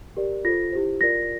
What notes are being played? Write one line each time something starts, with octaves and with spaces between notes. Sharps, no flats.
G4 A#4 D5
F4 A4 C5 A#6
E4 G4 C5
F4 A#4 D5 A#6